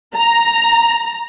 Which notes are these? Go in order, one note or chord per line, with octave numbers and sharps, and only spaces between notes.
A#5